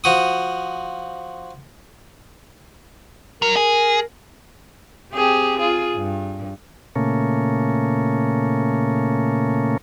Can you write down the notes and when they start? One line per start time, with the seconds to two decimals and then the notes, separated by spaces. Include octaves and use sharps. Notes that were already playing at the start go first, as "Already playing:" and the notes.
0.04 F3 F#4 D#6
3.42 F#3 A#4
3.56 G#4
5.13 C4 G4 G#4
5.59 F4 G#4
5.96 G2
6.96 A#2 C#3 A3 A#3 C#4